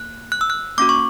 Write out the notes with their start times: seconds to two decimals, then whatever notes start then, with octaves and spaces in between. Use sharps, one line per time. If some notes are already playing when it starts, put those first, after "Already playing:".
Already playing: A#3 F#6
0.32 F#6
0.41 E6
0.50 F#6
0.78 A#3 C#4 F#4 D6
0.89 C#6